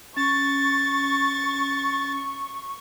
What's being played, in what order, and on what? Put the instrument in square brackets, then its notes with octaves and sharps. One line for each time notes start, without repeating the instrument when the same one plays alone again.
[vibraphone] C#4 [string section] C#6 [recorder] A6